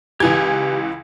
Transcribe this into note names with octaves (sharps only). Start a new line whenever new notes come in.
C#2 E3 G4 G#5 G#6